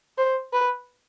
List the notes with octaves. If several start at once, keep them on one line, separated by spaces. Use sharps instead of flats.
C5
B4